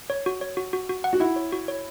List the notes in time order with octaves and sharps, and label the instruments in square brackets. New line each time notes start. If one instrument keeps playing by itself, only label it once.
[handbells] C#5
F#4
C#5
F#4
F#4
F#4
F#5
[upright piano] F#4
[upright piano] E4 [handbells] F#5
[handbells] C#5
F#4
C#5